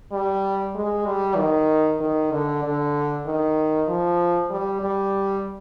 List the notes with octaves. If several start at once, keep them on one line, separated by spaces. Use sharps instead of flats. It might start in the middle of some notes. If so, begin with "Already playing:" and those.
G3
G#3
G3
D#3
D#3
D3
D3
D#3
F3
G3
G3